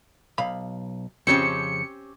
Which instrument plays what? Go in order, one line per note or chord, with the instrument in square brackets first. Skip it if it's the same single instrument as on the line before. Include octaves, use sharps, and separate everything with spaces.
[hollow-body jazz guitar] B1 F5 B5
[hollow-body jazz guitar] F2 C#3 F3 [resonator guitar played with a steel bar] C4 C#4 G4 [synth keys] C#7